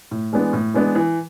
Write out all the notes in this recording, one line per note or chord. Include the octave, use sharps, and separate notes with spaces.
A2
E3 G#3 B3 D4
A2
E3 G#3 B3 D4
E3